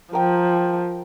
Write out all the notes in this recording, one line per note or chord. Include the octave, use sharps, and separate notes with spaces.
F3 A#4 G5